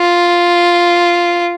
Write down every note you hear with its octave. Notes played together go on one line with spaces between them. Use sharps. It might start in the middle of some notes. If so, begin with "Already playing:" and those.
Already playing: F4